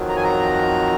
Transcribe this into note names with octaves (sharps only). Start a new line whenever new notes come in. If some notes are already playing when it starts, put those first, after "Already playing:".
Already playing: F2 D#3 F#3
A#5
G#5
A#5